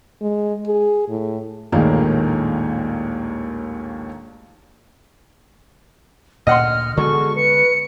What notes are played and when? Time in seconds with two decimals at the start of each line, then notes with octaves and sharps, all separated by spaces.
0.21 G#3
0.67 G#4
1.09 A2
1.72 A#1 D#2 A2 D#3 G#3 A#3
6.47 D2 A#2 D#5 F#5 C6 F6
6.97 D3 G#3 B3 F#4 G#4 A4 C#6
7.36 B4 C#7